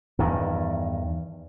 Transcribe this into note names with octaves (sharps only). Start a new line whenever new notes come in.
E2 G2 D#3